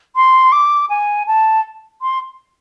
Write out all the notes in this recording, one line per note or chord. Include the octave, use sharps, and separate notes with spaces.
C6
D6
G#5
A5
C6